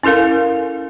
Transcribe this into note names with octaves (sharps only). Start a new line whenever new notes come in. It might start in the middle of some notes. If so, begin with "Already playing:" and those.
C#4 E4 A4 A#4 F5